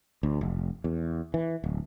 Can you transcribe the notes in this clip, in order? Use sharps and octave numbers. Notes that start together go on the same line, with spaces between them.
D2
F1
E2
E3
D1